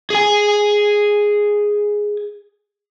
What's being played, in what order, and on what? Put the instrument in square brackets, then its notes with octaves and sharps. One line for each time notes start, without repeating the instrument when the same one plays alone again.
[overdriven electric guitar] G#4 G#5